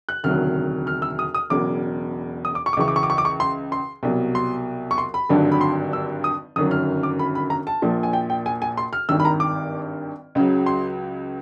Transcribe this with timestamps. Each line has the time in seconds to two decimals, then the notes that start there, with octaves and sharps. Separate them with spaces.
0.09 F#6
0.23 E1 D2 C3 D#3 F#3 F6
0.87 F6
1.02 E6
1.19 D#6
1.34 D#6
1.50 E1 E2 C#3 F#3 D6
2.45 D#6
2.55 D6
2.66 C#6
2.73 D6
2.77 C#2 C#3 E3 C#6
2.88 D6
2.96 C#6
3.03 D6
3.10 C#6
3.18 D6
3.25 C#6
3.40 C6
3.72 C6
4.03 C2 B2 F#3
4.35 C6
4.91 C#6
4.98 C6
5.14 B5
5.29 G#1 G2 D3 F#3
5.52 B5
5.61 C6
5.93 E6
6.24 D#6
6.56 G1 F#2 D#3 F#3 D#6
6.71 F6
7.03 D6
7.19 B5
7.35 B5
7.50 A#5
7.67 A5
7.82 A#1 A#2 F3
8.03 G#5
8.13 G5
8.30 G5
8.46 G#5
8.62 G#5
8.77 C6
8.93 F6
9.09 G#1 G2 D#3 E6
9.20 B5
9.25 A#5
9.40 D6
10.35 C#2 C#3 F#3
10.66 C6